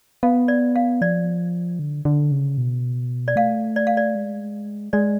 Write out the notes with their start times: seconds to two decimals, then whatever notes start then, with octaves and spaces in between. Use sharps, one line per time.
0.23 B3 F5
0.48 D5
0.76 F5
1.01 F3 D5
1.79 D3
2.05 D3
2.31 C#3
2.58 B2
3.28 D5
3.36 A3 F5
3.76 D5
3.87 F5
3.97 D5
4.15 G#3
4.93 G#3 D5